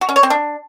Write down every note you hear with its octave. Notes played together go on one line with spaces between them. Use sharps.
F#4
C#4
C#5
C4
D4